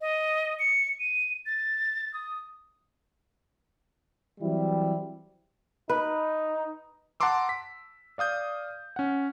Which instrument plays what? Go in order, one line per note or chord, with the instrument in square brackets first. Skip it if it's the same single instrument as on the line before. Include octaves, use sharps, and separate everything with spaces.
[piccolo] D#5
C#7
D#7
A6
D#6
[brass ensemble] E3 F#3 G3 C4 E4
[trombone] D#4 [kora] B4
[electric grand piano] F#5 A5 A#5 C6 D6 E6
B6
D5 F5 D#6 G6
C#4 F#5